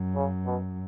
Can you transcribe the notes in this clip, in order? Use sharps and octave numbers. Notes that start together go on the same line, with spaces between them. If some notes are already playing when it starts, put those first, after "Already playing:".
Already playing: F#2
C#3
B2